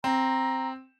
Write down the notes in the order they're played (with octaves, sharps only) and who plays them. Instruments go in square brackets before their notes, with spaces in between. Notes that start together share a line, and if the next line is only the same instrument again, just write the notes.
[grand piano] C4 [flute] A#5